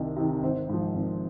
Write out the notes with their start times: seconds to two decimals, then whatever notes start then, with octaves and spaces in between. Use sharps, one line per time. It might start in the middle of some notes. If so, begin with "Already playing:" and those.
Already playing: C2 C3 D#3 D#5
0.16 C3 D#3
0.42 G#1 C5
0.69 G#2 F3
0.95 G#1